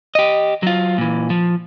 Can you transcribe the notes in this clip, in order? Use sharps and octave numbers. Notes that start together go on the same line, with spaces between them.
G4 D#5
F#3 F4
A#2 E3
F3